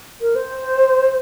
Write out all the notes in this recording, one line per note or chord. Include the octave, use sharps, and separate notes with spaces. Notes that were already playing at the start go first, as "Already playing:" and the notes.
A#4
C5